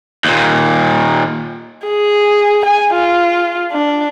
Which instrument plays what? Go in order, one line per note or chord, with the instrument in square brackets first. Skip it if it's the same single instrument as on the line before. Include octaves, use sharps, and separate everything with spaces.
[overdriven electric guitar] D#2 A#2
[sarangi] G#4
G#5
F4
D4